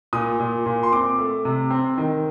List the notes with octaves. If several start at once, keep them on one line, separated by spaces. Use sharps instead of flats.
A#2 D#6
A#2
A#2
C6
C4 D6
A3
C3
C4
D#3